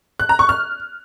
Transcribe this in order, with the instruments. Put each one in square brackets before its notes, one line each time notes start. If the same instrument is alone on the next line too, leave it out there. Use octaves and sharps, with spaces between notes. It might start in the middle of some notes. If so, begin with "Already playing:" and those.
[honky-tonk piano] F#6
A#5
C#6
F6